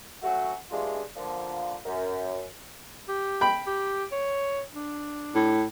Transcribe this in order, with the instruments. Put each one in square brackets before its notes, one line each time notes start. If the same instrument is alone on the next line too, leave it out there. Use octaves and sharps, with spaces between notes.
[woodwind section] F#3 A3 C#4 F#4
G2 E3 G#3 D4 F4
D3 F3 A#3
F#2
[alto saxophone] G4
[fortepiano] G5 B5
[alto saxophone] G4
C#5
D4
[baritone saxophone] A2